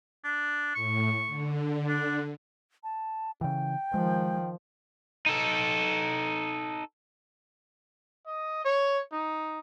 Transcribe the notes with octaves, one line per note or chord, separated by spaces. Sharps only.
D4
A2 C#6
D3
D4
A5
C#3 E3 G5
D#3 F3 G#3
D#4 A4
D#5
C#5
D#4